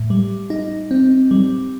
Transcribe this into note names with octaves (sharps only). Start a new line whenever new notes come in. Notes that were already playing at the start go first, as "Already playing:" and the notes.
Already playing: A2
G3
D#4
C4
G3